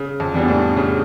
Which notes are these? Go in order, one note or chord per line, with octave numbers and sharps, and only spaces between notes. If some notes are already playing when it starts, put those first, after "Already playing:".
Already playing: C#3
F2
E3 G3 B3 D4
A2
C#3